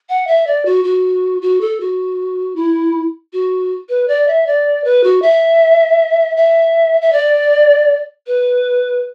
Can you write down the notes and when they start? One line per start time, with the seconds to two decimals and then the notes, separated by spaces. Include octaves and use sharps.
0.09 F#5
0.27 E5
0.47 D5
0.65 F#4
0.84 F#4
1.42 F#4
1.61 A4
1.80 F#4
2.55 E4
3.33 F#4
3.89 B4
4.08 D5
4.27 E5
4.47 D5
4.84 B4
5.03 F#4
5.22 E5
6.37 E5
7.01 E5
7.12 D5
8.27 B4